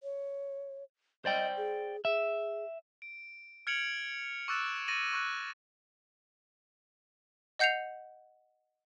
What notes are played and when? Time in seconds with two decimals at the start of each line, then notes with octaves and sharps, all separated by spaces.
0.03 C#5
1.25 C5 D5 D#5 G5
1.57 G#4
2.05 G#4 E5
3.02 D7
3.67 F6 G#6 C#7 D7 F7 F#7
4.48 C#6 D6 E6 F#6 A6 E7
4.88 C#6 A6 A#6 D#7 F#7
5.13 C#6 F#6
7.59 D#5 F#5 G6 C7 C#7 F7